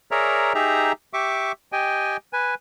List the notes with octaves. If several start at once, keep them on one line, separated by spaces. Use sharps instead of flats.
G#4 A#4 C#5 D5 E5 A#5
D#4 G4 G#4 E5 A#5
G4 E5 C#6 D6
G4 D#5 G5 G#5
B4 G#5